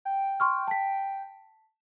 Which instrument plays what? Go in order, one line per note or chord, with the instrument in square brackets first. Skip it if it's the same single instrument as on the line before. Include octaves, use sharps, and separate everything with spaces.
[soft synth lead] G5
[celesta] C6 C#6 F6
A5 B6